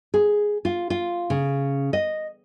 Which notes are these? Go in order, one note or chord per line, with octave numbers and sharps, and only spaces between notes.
G#4
F4
F4
C#3
D#5